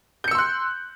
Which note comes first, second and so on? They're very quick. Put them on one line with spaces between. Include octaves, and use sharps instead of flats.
G6 C#7 E6 C6 F#6